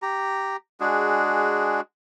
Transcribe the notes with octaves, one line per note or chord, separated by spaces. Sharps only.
G4 A#5
G#3 D4 F#4 G#4